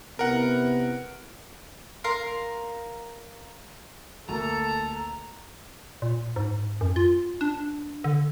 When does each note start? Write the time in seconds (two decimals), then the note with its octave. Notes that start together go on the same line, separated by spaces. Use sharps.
0.19 C3 B3 E4 A#4 F#5
2.04 A#4 F5 C6
4.29 D2 A#3 A4 A#5
6.02 A#2
6.36 G#2
6.81 F#2
6.96 F4
7.41 D4
8.04 D3